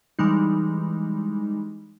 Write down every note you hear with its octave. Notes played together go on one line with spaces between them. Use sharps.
E3 G3 G#3 D#4